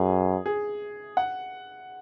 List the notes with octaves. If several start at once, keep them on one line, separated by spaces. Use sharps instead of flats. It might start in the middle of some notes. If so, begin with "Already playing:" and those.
Already playing: F#2 G#4
G#4
F#5